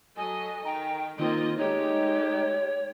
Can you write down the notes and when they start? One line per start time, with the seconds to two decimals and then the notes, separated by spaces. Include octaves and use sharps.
0.17 F#3 A4 D#5 G#5
0.65 D#3 G5 A#5
1.19 D#3 A#3 C4 F4 D#5
1.58 G#3 A3 D#4 G4 C#5